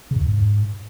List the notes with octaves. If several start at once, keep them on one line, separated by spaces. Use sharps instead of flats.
C#3
G2
E2
G#2